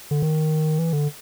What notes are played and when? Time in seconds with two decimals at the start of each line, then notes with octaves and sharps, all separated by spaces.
0.11 D3
0.22 D#3
0.79 E3
0.93 D3